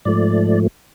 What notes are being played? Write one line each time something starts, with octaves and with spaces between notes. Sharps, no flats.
G#2 F3 A3 D5